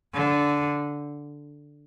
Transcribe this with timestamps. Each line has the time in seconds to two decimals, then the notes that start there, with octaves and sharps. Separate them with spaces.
0.14 D3